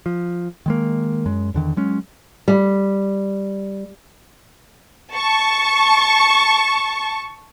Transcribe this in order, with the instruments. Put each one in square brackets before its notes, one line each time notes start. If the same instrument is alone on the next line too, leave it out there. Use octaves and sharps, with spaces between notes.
[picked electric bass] F3
D#3 G#3 A#3
F#2 G#3
E2 D3 D#3
F#3 G#3 C#4
[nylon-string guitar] G3
[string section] A5 C#6